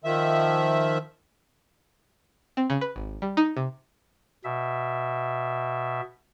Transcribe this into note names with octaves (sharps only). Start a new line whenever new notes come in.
D#3 F3 E5
C4
C#3
B4
G#1
G3
D#4
C3
B2 E5